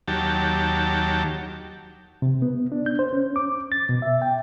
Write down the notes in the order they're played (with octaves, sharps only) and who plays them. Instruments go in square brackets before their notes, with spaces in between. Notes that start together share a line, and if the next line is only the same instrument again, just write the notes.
[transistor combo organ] D#2 F#3 G4 A5
[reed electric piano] C3
B3
D4
G6
C5
C#4
D6
A6
B2
E5
G5